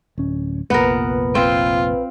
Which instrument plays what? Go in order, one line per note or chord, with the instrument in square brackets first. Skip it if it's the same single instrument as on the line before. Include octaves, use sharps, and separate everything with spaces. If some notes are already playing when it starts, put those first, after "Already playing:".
[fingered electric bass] D1 C#4
[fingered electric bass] F1 A#2 [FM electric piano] A#1 B4 [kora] B3 A#4
[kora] C4 [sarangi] F4